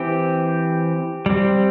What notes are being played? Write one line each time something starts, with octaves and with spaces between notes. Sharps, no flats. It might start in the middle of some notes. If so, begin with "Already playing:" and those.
Already playing: E3 C4 G4
G3 C4